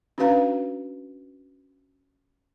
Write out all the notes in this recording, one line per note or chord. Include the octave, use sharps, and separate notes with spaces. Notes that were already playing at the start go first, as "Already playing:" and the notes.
C#4 D4 F#4 B4 F5 A#5